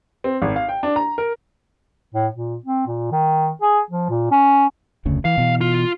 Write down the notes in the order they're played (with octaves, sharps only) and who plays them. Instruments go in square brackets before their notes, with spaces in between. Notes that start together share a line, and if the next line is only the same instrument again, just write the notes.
[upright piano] C4
G#1
F5
G5
D4
A#5
A#4
[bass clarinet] A2
A#2
C4
A#2
D#3
G#4
F3
A#2
C#4
[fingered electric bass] F1 D2 C#3
[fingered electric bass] E3 [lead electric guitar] F5
[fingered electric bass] B2 E3
[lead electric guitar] F4